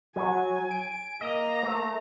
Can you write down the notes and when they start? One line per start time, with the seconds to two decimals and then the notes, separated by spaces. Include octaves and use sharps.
0.16 F#3 G#5
0.71 D7
1.21 A#3 D#5 A#5
1.63 A3